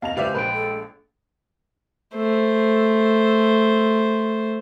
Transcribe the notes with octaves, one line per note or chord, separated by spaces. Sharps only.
D#2 D#5 F5 A5 F7
C#2 G#3 G4 B4 C5 D5 E5 F5
A#1 G#3 B4 G5
A4
A3 C5